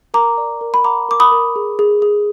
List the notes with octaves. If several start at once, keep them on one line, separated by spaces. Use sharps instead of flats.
A#4 A#5 D6
D5
A#4
B5
F#5 A#5 D6
A#4 D6
B5 D#6
A#4
G#4
G#4
G#4